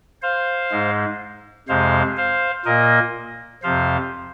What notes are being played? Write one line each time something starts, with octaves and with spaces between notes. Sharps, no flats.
C5 F5
G#2 G#3
F2 C3 G#3 C5 F5
C5 F5
A#2 A#3 A#4 D#5
F2 C3 F3 C5 F5